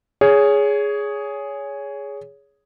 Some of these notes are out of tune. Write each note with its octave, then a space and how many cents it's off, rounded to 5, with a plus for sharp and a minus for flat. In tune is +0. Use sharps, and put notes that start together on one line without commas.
G#4 +0 C#5 +20